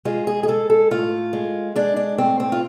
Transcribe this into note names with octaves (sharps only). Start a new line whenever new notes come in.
G#3 F4
G#4
G#4
G#3 A4
A4
A2 F4
G#3
G#3 D4
D4
A2 C4
C4
F4